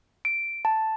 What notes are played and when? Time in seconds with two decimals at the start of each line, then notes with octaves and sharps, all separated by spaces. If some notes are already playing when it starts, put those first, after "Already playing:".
0.25 D7
0.65 A5